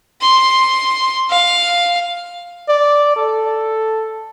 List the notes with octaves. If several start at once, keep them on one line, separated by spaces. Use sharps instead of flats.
C6
F5
D5
A4